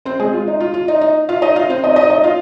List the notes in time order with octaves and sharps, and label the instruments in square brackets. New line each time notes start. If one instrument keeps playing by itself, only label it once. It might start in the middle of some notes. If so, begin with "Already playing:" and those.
[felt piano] C4 C5
G#3 G#4
F4
D#4
F4
F4
D#4
D#4
F4 F5
D#4 D#5
F4 F5
C4 C5
D#4 D#5
D#4 D#5
D#4 D#5
F4 F5